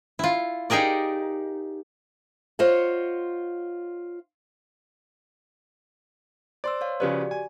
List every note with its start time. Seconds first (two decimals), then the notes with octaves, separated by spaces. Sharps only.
0.19 E4 F4
0.70 D#4 G4 G#4 A#4 D5
2.59 F4 C5 C#5 D#5 F#5
6.64 C5 D5 C6 E6
6.81 C#5 F5
7.00 C#3 F3 F#4 G4 B4 D5
7.31 G#5